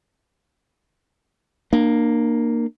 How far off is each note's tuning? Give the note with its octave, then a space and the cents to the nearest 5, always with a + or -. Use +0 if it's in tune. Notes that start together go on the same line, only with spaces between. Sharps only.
A#3 +0 D4 +40